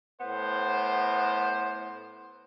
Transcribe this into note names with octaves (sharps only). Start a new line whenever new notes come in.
A2 B3 C5